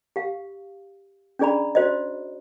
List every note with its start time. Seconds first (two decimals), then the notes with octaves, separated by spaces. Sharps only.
0.16 G4 F5
1.39 C#4 D4 G#4 D5 A#5 B5
1.75 F#4 C5 D5 D#5